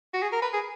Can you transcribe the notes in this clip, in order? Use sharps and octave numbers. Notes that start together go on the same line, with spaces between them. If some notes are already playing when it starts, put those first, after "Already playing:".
F#4
G#4
A#4
B4
G#4